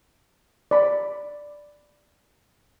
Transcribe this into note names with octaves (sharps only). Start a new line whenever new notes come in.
D5 B5